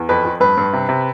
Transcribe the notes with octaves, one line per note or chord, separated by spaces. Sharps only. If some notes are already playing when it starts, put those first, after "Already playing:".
Already playing: E2
F2 B4
F2
G2 B4
G2
C3
C3